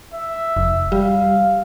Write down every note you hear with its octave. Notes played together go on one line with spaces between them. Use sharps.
E5
F1
G3 F5